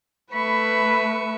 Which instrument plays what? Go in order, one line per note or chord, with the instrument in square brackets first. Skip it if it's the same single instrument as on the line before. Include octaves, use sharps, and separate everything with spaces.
[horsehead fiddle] A3 B4 [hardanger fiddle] E5 C#6 [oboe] B5